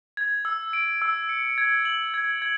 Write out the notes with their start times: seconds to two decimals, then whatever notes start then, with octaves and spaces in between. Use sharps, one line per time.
0.17 G#6
0.45 E6
0.73 D7
1.02 E6
1.29 C#7
1.58 G#6
1.85 F#7
2.14 G#6
2.42 G#6